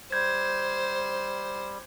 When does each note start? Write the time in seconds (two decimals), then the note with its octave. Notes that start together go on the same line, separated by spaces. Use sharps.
0.12 G3 C5 G6 G#6